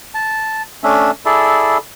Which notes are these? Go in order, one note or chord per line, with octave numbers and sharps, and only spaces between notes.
A5
A3 C#4 D4 E5
E4 G#4 A4 D5